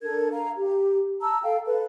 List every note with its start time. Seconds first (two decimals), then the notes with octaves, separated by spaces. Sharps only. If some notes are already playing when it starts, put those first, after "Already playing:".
0.02 D4 A4 A#4 G#6
0.31 F5 A#5
0.57 G4
1.21 A5 A#5 E6
1.44 A4 F5 G5
1.66 A4 B4